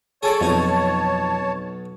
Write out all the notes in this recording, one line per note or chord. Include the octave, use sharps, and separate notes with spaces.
G#4 A4 C#5 D5 A5
B1 F2 D#4 F#4